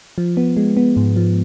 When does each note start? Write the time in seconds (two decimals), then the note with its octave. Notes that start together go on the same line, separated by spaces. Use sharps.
0.18 F3
0.37 B3
0.57 G#3
0.77 B3
0.97 G#2
1.16 F3